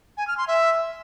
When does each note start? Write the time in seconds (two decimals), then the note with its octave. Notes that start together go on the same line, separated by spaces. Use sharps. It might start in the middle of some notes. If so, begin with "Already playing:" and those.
0.17 G#5
0.27 F6
0.37 C6
0.47 E5